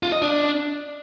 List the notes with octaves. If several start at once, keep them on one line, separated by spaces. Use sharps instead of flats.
F4
D#5
D4